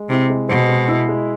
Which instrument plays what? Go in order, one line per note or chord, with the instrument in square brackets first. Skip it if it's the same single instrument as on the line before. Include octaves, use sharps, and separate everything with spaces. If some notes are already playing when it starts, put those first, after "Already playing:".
Already playing: [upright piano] G#3
[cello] C3 [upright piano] E4
[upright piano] G#3
[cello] B2 [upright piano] C4
[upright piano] G#3
E4
G#3